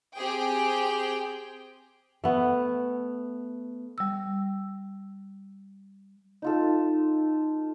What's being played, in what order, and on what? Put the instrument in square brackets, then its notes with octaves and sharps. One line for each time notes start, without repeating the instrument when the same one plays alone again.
[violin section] C4 G4 G#4 G5
[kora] A3 B3
[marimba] G3 E6
[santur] D#4 F4 A4